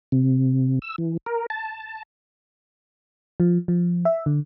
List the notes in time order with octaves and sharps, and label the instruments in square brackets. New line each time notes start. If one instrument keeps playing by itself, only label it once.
[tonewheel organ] C3
E6
E3
A#4
A5
[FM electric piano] F3
F3
E5
D3